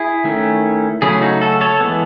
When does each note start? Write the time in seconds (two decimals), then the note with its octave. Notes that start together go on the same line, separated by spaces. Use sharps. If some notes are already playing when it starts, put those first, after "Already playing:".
Already playing: E4 G#4
0.24 D#3 A3 C#4
1.02 C#3 F#3 A3 C#4 E4 G#4
1.22 D#4 F#4
1.41 F#4 A4
1.61 A4 C#5
1.81 E3 G#3 B3